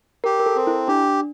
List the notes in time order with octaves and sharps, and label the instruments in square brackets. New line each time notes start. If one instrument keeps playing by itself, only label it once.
[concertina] G4 [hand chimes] A#4
[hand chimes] A#4
A4
[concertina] C4
[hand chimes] E4
[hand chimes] D4 [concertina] G4